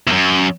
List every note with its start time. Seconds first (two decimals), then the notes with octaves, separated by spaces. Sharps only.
0.07 E2
0.12 F#2